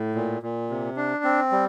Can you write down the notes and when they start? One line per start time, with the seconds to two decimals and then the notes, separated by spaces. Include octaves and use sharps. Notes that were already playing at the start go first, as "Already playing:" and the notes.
Already playing: A2
0.15 A#2
0.43 A#2
0.70 C3
0.97 D4
1.24 C4
1.52 G3